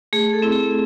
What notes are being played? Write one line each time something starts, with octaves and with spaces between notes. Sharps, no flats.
A3 G#4
A4
C4 E4
G#4